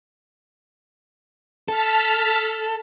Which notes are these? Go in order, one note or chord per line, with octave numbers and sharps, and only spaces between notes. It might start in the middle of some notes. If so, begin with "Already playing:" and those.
A4 A5 F6 B6